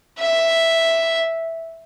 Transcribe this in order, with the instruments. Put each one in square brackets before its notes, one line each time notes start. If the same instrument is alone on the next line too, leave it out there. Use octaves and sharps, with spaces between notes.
[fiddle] E5